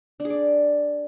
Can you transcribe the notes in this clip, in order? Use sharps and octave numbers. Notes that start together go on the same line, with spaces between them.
D4
G#4
D5